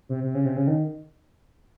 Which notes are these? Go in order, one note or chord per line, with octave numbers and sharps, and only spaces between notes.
C3
C3
C#3
C3
C#3
D#3